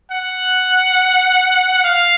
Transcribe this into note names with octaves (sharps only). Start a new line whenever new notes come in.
F#5
F5